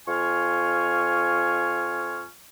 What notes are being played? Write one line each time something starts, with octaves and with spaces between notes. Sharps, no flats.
F2 F4 G#5 C#6 F6